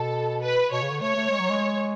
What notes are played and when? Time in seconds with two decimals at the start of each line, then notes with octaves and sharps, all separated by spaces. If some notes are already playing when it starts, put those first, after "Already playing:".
Already playing: B2 A4
0.42 B4
0.72 B2 C#5
0.82 C#3
0.91 D3
1.01 A3 C#5
1.15 A3
1.30 G#3
1.40 F#3
1.50 G#3